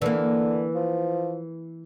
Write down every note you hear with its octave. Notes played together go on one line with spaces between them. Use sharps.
D3 E3 A#3
F3